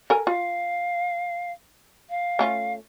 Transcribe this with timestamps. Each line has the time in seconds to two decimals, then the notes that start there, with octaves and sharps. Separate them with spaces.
0.10 A4 A#4 G#5
0.27 F4 F5
2.10 F5
2.39 A3 C#4 F4